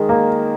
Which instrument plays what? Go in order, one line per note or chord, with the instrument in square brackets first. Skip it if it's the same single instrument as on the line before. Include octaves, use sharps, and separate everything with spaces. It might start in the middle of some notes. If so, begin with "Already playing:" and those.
Already playing: [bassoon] D#3 [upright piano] G#3
[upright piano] A#3